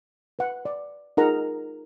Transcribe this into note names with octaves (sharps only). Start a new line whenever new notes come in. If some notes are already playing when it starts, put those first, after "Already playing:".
B4 F#5
D5
D#4 F4 G#4 A#4 F#5 A#5